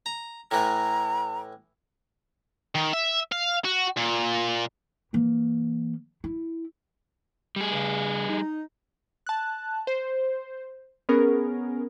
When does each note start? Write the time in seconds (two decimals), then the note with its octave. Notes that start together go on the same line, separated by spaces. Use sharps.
0.06 A#5
0.51 A2 E3 A#5
2.75 D#3
2.93 E5
3.32 F5
3.65 F#4
3.97 A#2
5.13 E3 A#3
6.24 E4
7.56 G3 G#4
7.70 G2 C#3
8.29 D#4
9.27 A5 F#6
9.87 C5
11.09 B3 C#4 G#4 A#4